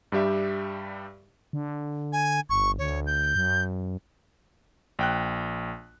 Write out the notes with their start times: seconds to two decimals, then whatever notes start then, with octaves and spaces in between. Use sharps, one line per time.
0.12 G2 G3 G4 E5
1.53 D3
2.13 G#5
2.50 G1 C#6
2.79 D2 C#5
3.06 G6
3.35 F#2
4.99 A#1 G5 F#6